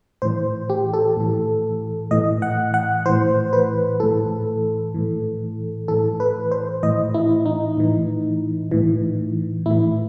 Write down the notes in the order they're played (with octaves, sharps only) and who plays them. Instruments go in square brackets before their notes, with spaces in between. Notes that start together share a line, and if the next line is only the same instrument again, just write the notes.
[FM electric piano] A2 E3 C5
G4
A4
A2 E3
A2 E3 D#5
F#5
F#5
A2 E3 C5
B4
A2 E3 A4
A2 E3
A2 E3 A4
B4
C5
A2 E3 D#5
E4
D#4
A2 E3
A2 E3
A2 E3 E4